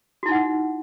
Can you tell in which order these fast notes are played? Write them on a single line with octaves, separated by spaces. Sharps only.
F#4 E4 D#4 F#5